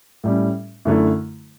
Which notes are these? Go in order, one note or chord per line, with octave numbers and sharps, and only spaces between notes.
A2 G3 C#4
F#2 D3 A3 E4